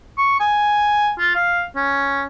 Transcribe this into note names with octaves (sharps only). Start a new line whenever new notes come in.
C#6
G#5
F4
F5
C#4